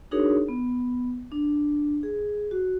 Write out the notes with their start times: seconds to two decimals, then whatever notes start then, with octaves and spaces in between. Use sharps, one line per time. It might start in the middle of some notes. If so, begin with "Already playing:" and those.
0.11 D4 D#4 F#4 G#4 A#4 C#5
0.49 B3
1.32 D4
2.03 G#4
2.51 F#4